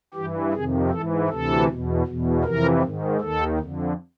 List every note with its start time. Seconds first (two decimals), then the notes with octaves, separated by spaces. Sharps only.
0.14 G2 E3 G4
0.52 F2 C3 D#3 G#4
0.90 G#2 E3 A4
1.28 D2 C3 E3 A4
1.67 E2 B2
2.06 E2 B2
2.43 F2 C3 E3 A#4
2.82 G#2 D#3
3.21 D#2 D#3 A4
3.59 F2 D3